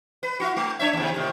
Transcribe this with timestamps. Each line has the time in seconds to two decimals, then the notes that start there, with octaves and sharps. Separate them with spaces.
0.23 B4
0.40 E4 F#4
0.56 A3
0.79 D4 C#5 E5
0.93 D#2 C3
1.14 A2 C3 D#3